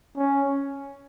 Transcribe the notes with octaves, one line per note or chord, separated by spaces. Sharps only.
C#4